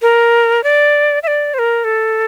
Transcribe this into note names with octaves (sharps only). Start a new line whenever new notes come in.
A#4
D5
E5
D5
C5
A#4
A4